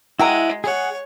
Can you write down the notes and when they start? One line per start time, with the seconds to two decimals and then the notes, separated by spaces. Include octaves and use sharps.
0.19 G#3 E4 F#4 F#5 G5 A#5
0.64 G#4 C#5 F#5